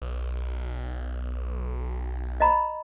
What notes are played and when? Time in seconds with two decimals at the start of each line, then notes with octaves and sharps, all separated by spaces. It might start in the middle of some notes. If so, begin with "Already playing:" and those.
0.02 B1
2.40 D#5 A#5 B5